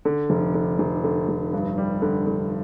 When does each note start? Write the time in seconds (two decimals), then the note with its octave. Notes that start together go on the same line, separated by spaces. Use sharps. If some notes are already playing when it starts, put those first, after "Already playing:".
0.05 D3
0.30 F1
0.54 D3
0.79 F1
1.04 D3
1.29 F1
1.53 G2
1.78 G3
2.02 D3
2.27 D3